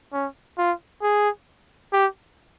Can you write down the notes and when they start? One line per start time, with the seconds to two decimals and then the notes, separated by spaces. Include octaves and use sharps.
0.13 C#4
0.58 F4
1.02 G#4
1.93 G4